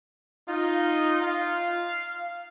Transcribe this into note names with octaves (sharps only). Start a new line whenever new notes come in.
D#4 F4
F5